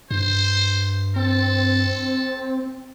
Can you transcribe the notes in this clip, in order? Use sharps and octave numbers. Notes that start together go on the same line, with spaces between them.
G2 C5
C4 A4